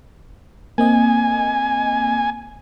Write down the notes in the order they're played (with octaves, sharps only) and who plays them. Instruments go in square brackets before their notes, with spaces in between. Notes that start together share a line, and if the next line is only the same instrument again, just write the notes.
[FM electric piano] A#3 C4 D#5 [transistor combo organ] G#5